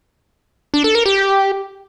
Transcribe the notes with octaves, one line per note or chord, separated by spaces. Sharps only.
D4
A4
A#4
G4